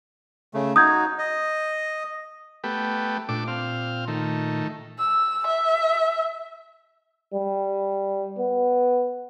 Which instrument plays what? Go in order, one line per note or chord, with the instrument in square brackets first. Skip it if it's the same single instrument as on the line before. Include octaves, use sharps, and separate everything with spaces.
[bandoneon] C#3 A3
[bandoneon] D#4 F#4 [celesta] D#6 G6 G#6
[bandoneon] D#5
[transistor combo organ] A3 B3 G4
[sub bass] A#2 [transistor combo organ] A3 D4 D6
[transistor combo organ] C4 F5
D#3 A3
[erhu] E6
E5
[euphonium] G3
B3